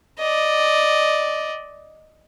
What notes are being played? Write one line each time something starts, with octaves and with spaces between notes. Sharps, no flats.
D5 D#5